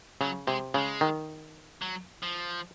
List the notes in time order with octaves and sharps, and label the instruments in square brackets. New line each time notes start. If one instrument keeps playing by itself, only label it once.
[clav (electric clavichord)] C#3 [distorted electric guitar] F#3
[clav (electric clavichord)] C3 [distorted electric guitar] G#3
[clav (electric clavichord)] C#3 [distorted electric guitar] G#3
[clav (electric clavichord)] D#3
[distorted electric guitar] F#3
F3